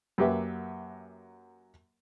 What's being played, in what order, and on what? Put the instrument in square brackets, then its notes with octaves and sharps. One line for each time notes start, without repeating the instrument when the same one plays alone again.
[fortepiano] F#2 A#3 G4 B4 E5